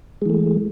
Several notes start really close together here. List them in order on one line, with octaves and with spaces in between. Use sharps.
G#3 E3 A3